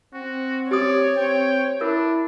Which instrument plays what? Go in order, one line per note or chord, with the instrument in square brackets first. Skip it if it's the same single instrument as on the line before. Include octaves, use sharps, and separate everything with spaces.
[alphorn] C4 [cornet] F#4
[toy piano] G4 D#6 [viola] C#5 [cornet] D5
[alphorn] C4 [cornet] G5
[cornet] D4 [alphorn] E4 [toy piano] A#4